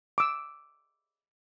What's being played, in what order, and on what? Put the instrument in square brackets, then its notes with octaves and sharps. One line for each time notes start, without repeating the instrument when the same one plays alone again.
[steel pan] D6 E6